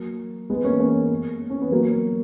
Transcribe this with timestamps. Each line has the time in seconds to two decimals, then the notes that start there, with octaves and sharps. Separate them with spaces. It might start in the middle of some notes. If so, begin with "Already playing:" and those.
Already playing: F#3 A#3
0.50 G#3 B3
0.64 A#3 C#4
0.79 A#3 C#4
1.50 C#4
1.62 B3
1.71 F#3 A#3